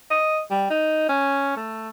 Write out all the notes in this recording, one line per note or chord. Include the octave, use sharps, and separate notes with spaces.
D#5
G3
D#4
C#4
A3